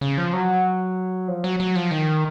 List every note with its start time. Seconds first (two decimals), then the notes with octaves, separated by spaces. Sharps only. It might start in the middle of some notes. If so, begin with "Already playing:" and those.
0.01 C#3
0.18 F3
0.33 F#3
1.28 F3
1.44 F#3
1.60 F#3
1.76 F3
1.91 D#3